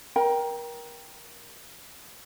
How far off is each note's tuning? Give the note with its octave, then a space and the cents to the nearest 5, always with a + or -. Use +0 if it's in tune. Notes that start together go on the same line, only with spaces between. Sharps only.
A#4 +25 G5 +0 B5 -45